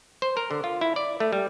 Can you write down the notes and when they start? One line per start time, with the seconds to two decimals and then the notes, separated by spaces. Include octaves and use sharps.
0.22 C5
0.37 A#4
0.51 D3
0.64 F4
0.81 E4
0.96 D5
1.20 A3
1.33 G3